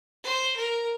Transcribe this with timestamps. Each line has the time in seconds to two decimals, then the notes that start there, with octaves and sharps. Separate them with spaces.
0.24 C5
0.57 A#4